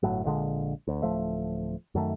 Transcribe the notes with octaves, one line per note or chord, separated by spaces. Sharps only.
G1 A2 F#3
A#1 A#2 D3 G#3
D2
D1 F3 A3
F#2 D#3 A3